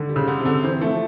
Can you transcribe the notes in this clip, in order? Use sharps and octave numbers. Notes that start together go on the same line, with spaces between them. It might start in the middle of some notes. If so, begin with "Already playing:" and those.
Already playing: D3 D#3
G3
C#3
D3
C3
D3
E3 C4
F3 A3